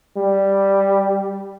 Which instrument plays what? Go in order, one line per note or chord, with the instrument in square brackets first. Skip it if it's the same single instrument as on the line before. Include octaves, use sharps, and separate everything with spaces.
[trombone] G3